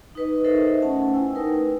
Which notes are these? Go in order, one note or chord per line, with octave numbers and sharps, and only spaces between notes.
D#4 B4 D#5
D#4 A4 A#4 C5 D#5 E5
A3 C#4 F#5 A5
E4 G5 G#5 E6
A3 D#4 A#4 B4 G5